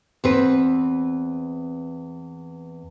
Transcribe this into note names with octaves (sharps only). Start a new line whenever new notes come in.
E2 C4 B4